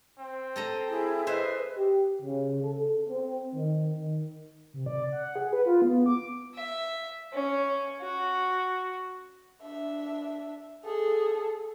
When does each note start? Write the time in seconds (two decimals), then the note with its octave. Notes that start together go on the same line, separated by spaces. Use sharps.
0.19 C4
0.56 A4 D#5 A#5
0.90 E4 G#4
1.27 B4 C5 D#5 E5
1.77 G4
2.22 C#3
2.63 A4
3.09 C4
3.55 D#3
3.98 D#3
4.74 C3
4.86 D5
5.12 F#5
5.36 G#4
5.53 B4
5.66 F4
5.82 B3
6.06 D6
6.55 E5
7.33 C#4
8.02 F#4
9.62 D4 E5
10.84 G#4 A4